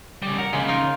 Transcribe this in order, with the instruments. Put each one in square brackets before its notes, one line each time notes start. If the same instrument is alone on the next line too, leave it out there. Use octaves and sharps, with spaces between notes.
[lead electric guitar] C#3 G3
[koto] A#4 [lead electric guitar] F#5
[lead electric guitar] C#3 [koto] G#3 A#3
[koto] D#4 F4 A#4